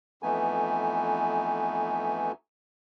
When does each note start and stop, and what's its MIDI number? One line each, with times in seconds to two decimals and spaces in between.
0.23 2.32 41
0.23 2.32 52
0.23 2.32 57
0.23 2.32 59
0.23 2.32 63
0.23 2.32 80